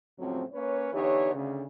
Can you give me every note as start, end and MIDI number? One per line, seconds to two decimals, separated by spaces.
0.19 0.44 37
0.19 0.44 42
0.19 0.44 45
0.19 0.44 53
0.19 0.44 54
0.19 0.44 60
0.53 0.89 58
0.53 0.89 61
0.53 0.89 71
0.53 0.89 73
0.93 1.31 50
0.93 1.31 52
0.93 1.31 59
0.93 1.31 63
0.93 1.31 67
0.93 1.31 73
1.34 1.63 38
1.34 1.63 49